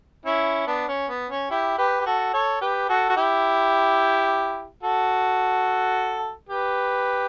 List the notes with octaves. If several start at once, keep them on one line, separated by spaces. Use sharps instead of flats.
C#4 E4
B3 D4
C#4
B3
C#4
E4 G4
G4 B4
G4
F#4 A4
A4 C#5
G4 B4
F#4 A4
F#4
E4 G4
F#4 A4
G4 B4